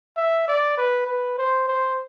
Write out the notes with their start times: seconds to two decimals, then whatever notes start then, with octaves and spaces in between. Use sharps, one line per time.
0.17 E5
0.48 D5
0.78 B4
1.07 B4
1.38 C5
1.68 C5